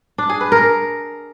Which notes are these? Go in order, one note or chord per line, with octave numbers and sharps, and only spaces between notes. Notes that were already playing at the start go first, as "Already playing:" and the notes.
D4
G#4
B4
A#4